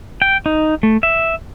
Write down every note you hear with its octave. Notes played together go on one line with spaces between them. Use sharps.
G5
D#4
A3
E5